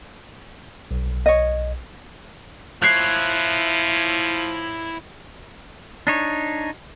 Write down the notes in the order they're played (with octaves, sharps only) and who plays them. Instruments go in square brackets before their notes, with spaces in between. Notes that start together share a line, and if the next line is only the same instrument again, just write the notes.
[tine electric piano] B1
[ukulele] C#5 D#5
[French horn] F3 [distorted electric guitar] E4 C#5 [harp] F#6 G#6 C7
[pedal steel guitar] D4 D#4 C#5